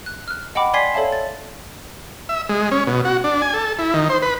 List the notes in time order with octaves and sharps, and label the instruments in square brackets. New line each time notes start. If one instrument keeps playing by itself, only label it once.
[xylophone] F#6
F6 F#6
D#5 F#5 G5 B5 D6
D5 G#5 C6 G#6 B6 C7
A4 C#5 D5 E5 F5 A5
A6
[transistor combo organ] E5
G#3
C#4
B2
F#4
D4
G#5
A4
E4
D#3
C5
B4